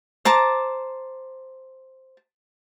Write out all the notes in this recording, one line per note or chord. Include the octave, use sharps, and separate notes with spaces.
C5 A5 A#5 D6